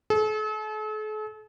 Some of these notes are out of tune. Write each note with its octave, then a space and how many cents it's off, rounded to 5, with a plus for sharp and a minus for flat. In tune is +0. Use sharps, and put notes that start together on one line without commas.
A4 -45